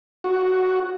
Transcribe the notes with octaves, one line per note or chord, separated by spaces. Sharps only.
F#4